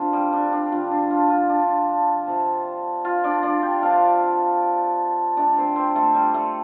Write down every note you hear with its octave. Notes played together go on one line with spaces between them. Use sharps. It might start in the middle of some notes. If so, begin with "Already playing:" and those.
Already playing: C3 C4 D4 F4
G3 G4
D4
D4
D3 G3 C4 F4
D4
F4
F4
D4
C3 F3 C4
F4
D4 D5
D4 D5
G4 G5
C3 F3 C4 F4 F5
C3 A3 C4 D4 D5
C4 C5
C4 C5
A3 A4
G3 G4
A3 A4